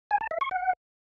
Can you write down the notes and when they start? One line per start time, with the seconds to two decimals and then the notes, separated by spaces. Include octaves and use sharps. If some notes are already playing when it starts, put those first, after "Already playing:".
0.11 G#5
0.21 A5
0.31 E5
0.41 C#6
0.51 F#5